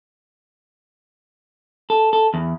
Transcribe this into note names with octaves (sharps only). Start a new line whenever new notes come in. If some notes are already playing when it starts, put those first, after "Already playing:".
A4
A4
E2